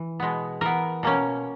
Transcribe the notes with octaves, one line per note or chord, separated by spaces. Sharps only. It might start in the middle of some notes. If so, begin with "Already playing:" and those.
Already playing: E3
B2 G#3 B3
E3 B3 A#4
B2 A#3 C#4